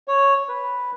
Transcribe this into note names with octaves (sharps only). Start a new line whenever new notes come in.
C#5
B4